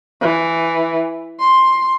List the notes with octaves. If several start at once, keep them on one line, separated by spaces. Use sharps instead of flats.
E3
C6